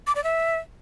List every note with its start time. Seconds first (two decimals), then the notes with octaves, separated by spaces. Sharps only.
0.07 D6
0.15 D5
0.24 E5